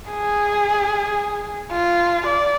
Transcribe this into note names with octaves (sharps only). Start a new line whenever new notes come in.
G#4
F4
D5